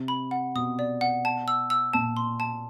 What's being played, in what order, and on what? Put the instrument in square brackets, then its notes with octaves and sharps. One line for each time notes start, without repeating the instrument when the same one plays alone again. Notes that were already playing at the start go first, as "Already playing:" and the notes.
Already playing: [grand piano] C3
[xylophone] B5
F#5
[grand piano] B2 [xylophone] D#6
[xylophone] D5
F#5
A5
E6
E6
[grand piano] A#2 [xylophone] A5
[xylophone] C6
A5